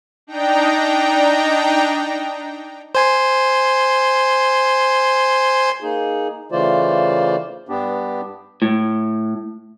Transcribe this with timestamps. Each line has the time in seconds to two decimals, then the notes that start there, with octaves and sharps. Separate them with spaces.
0.27 D4 D#4 G5 A#5
2.95 C5 G#5 C6
5.80 A#3 D#4 G#4
6.52 C#3 E3 A3 F4 C5 D5
7.69 G2 B3 D4 G4
8.62 A2